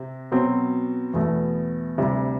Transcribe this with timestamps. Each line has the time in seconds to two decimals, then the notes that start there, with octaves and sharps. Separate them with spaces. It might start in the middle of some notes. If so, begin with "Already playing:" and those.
Already playing: C3 C4
0.32 B2 F#3 C4
1.14 E2 B2 A3
1.98 D2 C3 G3